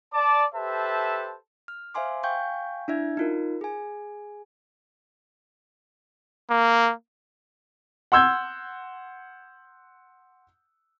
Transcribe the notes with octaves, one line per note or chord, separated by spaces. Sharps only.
D5 A5 D6
G4 A4 B4 C5 E5 A5
F6
C5 E5 F5 G#5 C6 D6
F5 G5 G#5 C#6 G6
D4 E4 E5 G#6
D#4 F4 A#4
G#4 G#5
A#3
F#5 C6 E6 G6 G#6